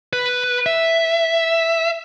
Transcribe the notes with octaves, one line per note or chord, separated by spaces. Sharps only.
B4
E5